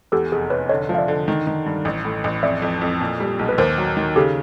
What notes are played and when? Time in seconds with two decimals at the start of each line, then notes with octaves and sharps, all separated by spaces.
0.12 E2 G4 A4
0.32 F1 G#4
0.50 F1 B4 C#5
0.69 D3 C#5 D#5
0.89 F3
0.95 F5
0.98 D5 E5
1.08 D3
1.28 D#3
1.47 D#3
1.66 G2
1.85 A1
2.05 A2
2.24 A1
2.43 F2 D5 E5
2.62 F2
2.81 F2
3.01 A#2
3.20 G3
3.39 B1
3.49 B4
3.58 D#2 A#4 C5
3.78 F#3
3.97 D#3
4.16 C#3 G4 A4